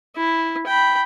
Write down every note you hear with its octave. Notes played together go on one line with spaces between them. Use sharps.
E4
G5 B5